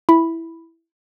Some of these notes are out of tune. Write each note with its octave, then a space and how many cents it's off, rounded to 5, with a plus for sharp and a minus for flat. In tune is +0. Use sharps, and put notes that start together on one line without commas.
E4 +0 B5 +0